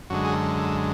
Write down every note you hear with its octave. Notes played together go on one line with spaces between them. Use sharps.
F#2 D3 G#3 F#4
G#4
A4
A4